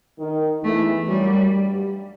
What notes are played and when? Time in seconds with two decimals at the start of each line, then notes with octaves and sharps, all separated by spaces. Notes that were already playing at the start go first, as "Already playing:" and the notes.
0.19 D#3
0.63 E2 E3 A3
1.07 F#2 F#3 G3
1.52 G2 G3